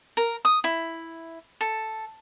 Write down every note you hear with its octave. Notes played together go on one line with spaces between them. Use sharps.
A#4
D#6
E4
A4